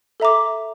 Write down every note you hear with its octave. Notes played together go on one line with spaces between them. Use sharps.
A4 E5 A#5 D6